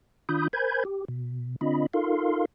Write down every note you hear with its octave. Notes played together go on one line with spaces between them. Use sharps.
D#3 D4 F4 B5 D#6 G6
A#4 C5 G#5 B5 G6 G#6
G4
B2
D3 C4 D4 F4 D#5 B5
D#4 F4 A4 A#4 F5 C6